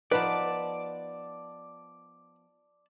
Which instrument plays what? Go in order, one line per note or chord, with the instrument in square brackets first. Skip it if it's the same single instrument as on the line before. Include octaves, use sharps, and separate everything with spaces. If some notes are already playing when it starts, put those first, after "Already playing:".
[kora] F3 B3 D#4 [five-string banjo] B4 [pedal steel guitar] D5 A5